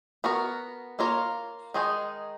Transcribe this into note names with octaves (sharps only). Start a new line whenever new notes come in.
B3 F#4 A#4
A#3 F4 A#4 C#5
D#3 G#3 D#4 G#4